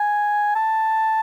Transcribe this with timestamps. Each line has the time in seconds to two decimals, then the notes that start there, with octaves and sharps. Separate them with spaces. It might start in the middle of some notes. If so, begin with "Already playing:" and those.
Already playing: G#5
0.56 A5